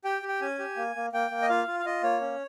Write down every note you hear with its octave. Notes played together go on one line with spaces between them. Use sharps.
G4 G5
G4
G5
C#4 G#5
G4
A#3
A#3
A#3 G5
A#3
D#5
F4 F5
F4
F5
F4 D#5
A#3 C#5
C#4